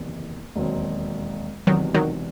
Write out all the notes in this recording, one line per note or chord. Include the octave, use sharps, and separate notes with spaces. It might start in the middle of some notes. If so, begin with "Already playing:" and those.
Already playing: F#1 E2 C3 D#3
E1 D#2 D#3 F#3 C4
E1 E2 C3 D#3 F#3
D#3 F#3